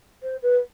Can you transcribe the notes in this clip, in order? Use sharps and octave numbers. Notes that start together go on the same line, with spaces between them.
C5
B4